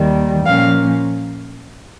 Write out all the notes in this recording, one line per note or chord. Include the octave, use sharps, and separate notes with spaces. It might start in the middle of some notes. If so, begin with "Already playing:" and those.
Already playing: D#2 D#3 G3
A#2 F3 A#3 C#4 F5